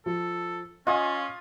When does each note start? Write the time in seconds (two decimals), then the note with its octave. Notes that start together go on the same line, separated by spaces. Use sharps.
0.06 F3 A4
0.87 C#4 F4 D#5 G#5 D#6